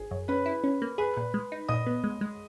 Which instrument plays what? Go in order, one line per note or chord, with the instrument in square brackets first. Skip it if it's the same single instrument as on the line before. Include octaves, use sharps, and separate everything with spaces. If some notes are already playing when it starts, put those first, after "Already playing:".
Already playing: [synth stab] G#1 [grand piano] G#4
[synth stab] F#2
[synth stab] C#4 [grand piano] B4 B5
[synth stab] E4
C#4
A#3
[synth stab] G#4 [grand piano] B4 B5
[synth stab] A#2
G#3
D#4
[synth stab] A#2 [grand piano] D#5 D#6
[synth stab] B3
G#3
G#3